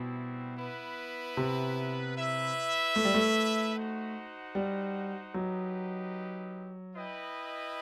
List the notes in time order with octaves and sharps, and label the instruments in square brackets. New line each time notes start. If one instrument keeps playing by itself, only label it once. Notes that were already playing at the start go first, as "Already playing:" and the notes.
Already playing: [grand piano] B2 [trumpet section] G3 C4 E4
[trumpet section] B3 E4 B4
[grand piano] C3
[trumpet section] E4 B4 E5
[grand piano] A3
G3
A3
[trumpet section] D#4 F#4 C5 F#5
[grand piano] G3
[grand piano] F#3 [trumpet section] D#4 G4 B4 D#5
[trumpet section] E4 B4 D#5 G5